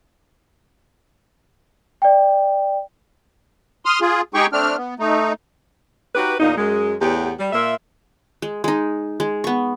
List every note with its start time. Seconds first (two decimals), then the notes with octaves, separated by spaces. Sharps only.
2.02 D5 G5
3.85 C6 D#6 F6
4.01 F4 G#4
4.34 G#3 D#4 G4 G#4 G5 C#6
4.53 A3 C4 D4 F6
4.77 B3
4.99 A3 D#4
6.15 D#4 F#4 G4 B4
6.40 E2 A#2 A#3 D#4
6.57 F#2 G#3
7.01 E2 A2 B3 G4
7.38 G3
7.53 A#2 A#3 F4 E5
8.42 G#3
8.64 G#3 D#4
9.20 G#3
9.44 B3 C#6